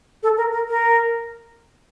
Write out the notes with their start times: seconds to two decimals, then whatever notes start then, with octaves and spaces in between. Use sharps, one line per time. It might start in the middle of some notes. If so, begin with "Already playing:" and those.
0.23 A4
0.38 A#4
0.53 A#4
0.69 A#4